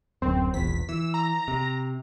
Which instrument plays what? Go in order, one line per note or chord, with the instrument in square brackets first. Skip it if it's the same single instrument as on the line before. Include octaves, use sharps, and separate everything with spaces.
[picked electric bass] D1 F#2 [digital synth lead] C4
[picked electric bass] E1 A#1 E2 [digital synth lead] B6
[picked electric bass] E3 [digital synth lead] E6
[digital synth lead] A#5
[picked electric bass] C3